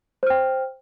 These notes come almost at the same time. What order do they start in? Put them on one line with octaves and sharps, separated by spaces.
C5 F6 G5